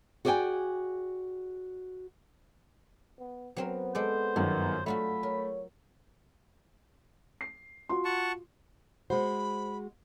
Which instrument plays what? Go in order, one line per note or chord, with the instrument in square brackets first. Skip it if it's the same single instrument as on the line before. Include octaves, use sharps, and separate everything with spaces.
[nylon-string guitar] F#4 G#4 D5 D#5 G5 G#5
[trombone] B3
[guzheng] F#3 C4 A#4 [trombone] B3
[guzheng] G#3 A4 D5 [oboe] C5
[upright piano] G1 F#2 D#3 [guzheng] F#4
[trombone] D3 [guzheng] F#3 F4 F#4 [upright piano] A3 [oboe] B5
[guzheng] A#4 [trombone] C#5
[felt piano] C7
F4 F#4 C6
[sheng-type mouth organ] F#5 A5 C#6
[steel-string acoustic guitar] G#3 F#4 [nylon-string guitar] C5 [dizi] B5